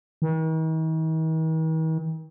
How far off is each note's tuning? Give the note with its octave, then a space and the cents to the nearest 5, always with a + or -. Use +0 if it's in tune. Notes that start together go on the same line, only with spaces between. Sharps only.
D#3 +45